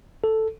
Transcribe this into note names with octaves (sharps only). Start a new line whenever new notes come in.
A4